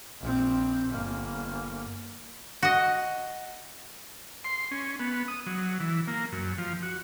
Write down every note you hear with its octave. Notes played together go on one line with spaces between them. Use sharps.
A#1 C4
G1 A#3
F#4 D#5
C6
C#4
B3
D#6
F#3
E3
A#3
F#2
F3
F#4